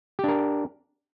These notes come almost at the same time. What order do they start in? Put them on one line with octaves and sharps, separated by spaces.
G4 D4 A#4